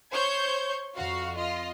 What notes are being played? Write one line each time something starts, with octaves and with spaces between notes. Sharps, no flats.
C5 C#5 C#6 G6 G#6
F2 F#4 F5
F4 D#5